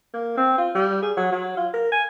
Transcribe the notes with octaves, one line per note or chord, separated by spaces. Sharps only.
A#3
C4
F4
G3
G#4
F#3
F#3
F4
A#4
G#5